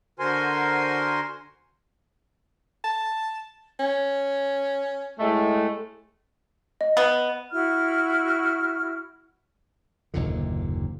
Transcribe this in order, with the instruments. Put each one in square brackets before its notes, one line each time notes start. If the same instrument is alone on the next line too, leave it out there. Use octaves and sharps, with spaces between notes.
[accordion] D3 F#4 A#4 C5 G#5 C6
[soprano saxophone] A5
C#4
[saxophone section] A2 G#3 A3
[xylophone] D#5
[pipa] B3
[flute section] E4 F#4 F6
[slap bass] F#1 D#2 A#2 D3